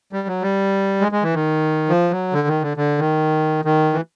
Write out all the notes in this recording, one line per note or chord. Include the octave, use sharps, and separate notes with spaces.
G3
F#3
G3
G#3
G#3
E3
D#3
F3
F#3
D3
D#3
D3
D3
D#3
D#3
E3